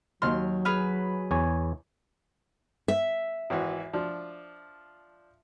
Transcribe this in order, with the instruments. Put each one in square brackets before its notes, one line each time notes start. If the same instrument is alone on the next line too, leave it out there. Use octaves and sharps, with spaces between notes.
[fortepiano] D#2 C6 [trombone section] F#3 [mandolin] F6
[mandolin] G#4 B4 F6
[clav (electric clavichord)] E2 C#5 G#5
[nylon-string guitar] E5
[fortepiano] G#1 E3 F#4
F3 D4